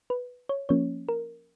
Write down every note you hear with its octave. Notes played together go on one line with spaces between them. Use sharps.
B4
C#5
F3 A#3 C#4 C#5
A#4